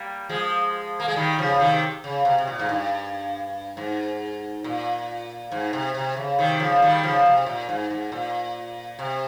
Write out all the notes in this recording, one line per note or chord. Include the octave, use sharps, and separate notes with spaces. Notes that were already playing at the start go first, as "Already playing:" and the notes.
Already playing: G3 A#3
F3 G#3
A#3
G#3
D#3 G3
C#3 F3
C3 D#3
C#3
C3
C3
A#2
G#2
G2
G#2
A#2
G#2
C3
C3
C#3
C3 D#3
C#3 F3
D#3 G3
C#3 F3
C3
A#2
G#2
G#2
A#2
C3